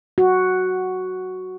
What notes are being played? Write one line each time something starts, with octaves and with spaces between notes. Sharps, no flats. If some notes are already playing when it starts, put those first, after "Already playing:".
F#4